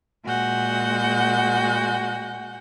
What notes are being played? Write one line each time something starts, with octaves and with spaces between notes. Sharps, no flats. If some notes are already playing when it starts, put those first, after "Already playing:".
A#2 G#3 F#4 F#5 G#5 G6